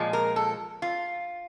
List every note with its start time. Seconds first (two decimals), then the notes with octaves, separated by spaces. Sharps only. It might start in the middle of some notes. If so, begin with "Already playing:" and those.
Already playing: A#2 F3 G#3
0.13 A#4
0.36 A4
0.82 F4